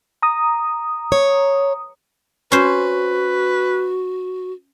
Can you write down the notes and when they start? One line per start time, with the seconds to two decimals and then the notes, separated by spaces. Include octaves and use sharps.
0.22 A#5 D#6
1.12 C#5
2.52 C#4 F#4 B4 C5